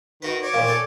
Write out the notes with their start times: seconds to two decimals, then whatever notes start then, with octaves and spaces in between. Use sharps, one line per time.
0.22 D#3 D#4 F#4 B4
0.42 C#5 D5
0.54 D#2 A#2 F3
0.67 A4 G5 G#5